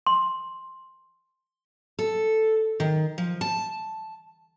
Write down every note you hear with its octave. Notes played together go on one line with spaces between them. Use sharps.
C6
A4
D#3
F3
A5